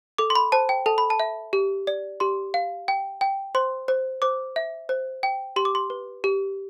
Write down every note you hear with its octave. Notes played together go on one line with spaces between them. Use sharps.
A4 D6
C6
B5
C5 A5
G5
A4 A5
B5
A5
E5
G4
D5
G4 C6
F5
G5
G5
C5 C6
C5
C5 D6
E5
C5
G5
G4 C6
D6
C6
B4
G4